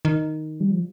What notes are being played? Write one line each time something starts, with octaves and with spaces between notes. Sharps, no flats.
D#3
G3
F3